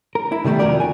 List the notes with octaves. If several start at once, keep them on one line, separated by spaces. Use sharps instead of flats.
A#4
E4
C3 D#3 G3 A3 B3
F2 B2 D#3 F#3 A#4 D5
G#5